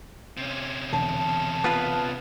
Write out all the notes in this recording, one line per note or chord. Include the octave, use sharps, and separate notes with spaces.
C3 C#4
E1 D3 A5
B3 F4 B4